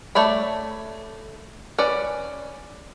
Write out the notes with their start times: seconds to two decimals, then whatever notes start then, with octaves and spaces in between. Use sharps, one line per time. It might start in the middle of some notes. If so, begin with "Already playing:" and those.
0.15 A3 C#5 D5 B5
1.78 C#4 B4 D5